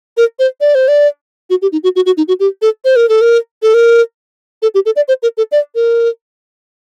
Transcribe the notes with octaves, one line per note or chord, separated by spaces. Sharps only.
A#4
C5
D5
C5
D5
F#4
G4
D#4
F#4
F#4
F#4
D#4
F#4
G4
A4
C5
A#4
A4
A#4
A4
A#4
A4
G4
A4
D5
C5
A#4
A4
D5
A#4